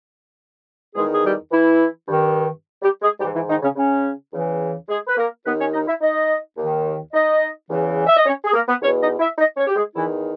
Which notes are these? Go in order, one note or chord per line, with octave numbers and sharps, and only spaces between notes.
E2 D#3 G#3 G#4
G#4
G3 G4
E3 E4
G2 D#3
G3 G4
G#3 G#4
G#2 E3 G3 G4
E3 E4
D#3 D#4
C#3 C#4
C#3 C#4
E2 C#3 E3
G#3 G#4
B4
A#3 A#4
D#2 D#3 B3 B4
C#4 C#5
D#4 D#5
E4 E5
D#4 D#5
D#2 D#3
D#4 D#5
E2 C#3 E3
E5
D#5
C#4 C#5
G#4
A#3 A#4
B3 B4
E2 B2 C#4 C#5
D#4 D#5
E4 E5
D#4 D#5
C#4 C#5
G4
G#3 G#4
E2 D#3 E3 E4